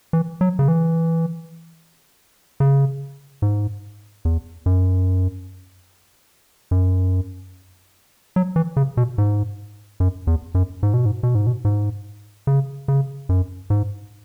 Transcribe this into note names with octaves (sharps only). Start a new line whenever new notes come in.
E3
F#3
C#3
E3
C#3
G#2
E2
F#2
F#2
F#3
E3
C#3
B2
G#2
F#2
E2
F#2
G#2
B2
G#2
B2
G#2
B2
G#2
C#3
C#3
F#2
G#2